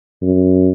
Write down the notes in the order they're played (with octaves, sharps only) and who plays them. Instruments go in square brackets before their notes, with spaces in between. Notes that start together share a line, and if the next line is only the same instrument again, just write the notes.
[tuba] F#2